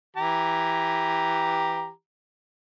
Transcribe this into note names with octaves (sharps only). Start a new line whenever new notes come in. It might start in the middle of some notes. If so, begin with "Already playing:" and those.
E3 G4 A#5